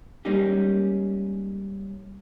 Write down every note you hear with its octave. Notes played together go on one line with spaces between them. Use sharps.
G3 G#3 A#3 C#4 D#4 G4